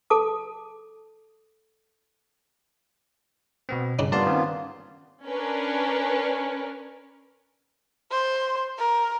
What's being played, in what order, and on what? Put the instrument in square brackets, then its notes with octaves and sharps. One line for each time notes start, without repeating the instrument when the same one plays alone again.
[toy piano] A4 A5 D6
[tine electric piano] B2 B3 C4
[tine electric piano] G2 [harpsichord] C#3 D4 D#4
[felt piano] G2 [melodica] A#3 B3 F4 [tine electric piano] D5 A5 C6
[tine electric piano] D#3 [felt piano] C4 C#4
[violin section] C#4 D4 A#4 B4
[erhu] C5
A#4